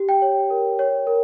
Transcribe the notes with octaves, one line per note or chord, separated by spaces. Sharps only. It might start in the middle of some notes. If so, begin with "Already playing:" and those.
Already playing: G4
G5
C#5
A#4
C#5
A#4